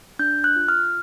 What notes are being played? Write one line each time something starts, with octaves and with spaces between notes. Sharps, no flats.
D4 G6
F#6
F4
F6